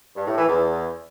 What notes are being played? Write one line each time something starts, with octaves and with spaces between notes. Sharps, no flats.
G2
A2
E3
E2